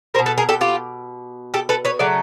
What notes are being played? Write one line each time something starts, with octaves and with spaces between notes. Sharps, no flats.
G3 A#4 C5
B2
A4 B4
G#4 A#4
G4 A4
F4 G4
G4 A4
A4 B4
B4 C#5
C#3 F#3 A3 D5